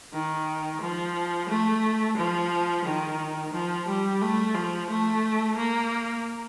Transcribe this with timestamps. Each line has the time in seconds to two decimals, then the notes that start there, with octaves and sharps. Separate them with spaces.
0.12 D#3
0.81 F3
1.49 A3
2.17 F3
2.84 D#3
3.53 F3
3.87 G3
4.21 A3
4.54 F3
4.89 A3
5.56 A#3